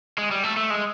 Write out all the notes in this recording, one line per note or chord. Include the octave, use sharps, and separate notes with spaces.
G#3
G3
A3
A3
G#3